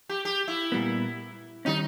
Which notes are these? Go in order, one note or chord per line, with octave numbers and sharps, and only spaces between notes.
G4
G4
E4
A#2 G3 B3
D#3 G3 C#4 D#4